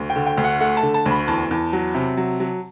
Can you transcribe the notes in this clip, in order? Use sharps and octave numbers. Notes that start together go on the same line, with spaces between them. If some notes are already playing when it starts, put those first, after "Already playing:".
Already playing: D2
G5
D3
G5
D2
F#5
A3 F#5
A5
D3
A5
D2 B5
E2 A5
E2
F#3
C3
F#3
F#3